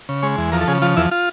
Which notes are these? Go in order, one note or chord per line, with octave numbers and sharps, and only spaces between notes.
C#3
G#3 C#5
E2
F3 A#4
A4
C#3 G#4
F3 F4
E2 E4
F4